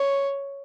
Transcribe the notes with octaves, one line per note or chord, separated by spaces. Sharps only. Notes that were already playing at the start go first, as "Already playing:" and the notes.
Already playing: C#5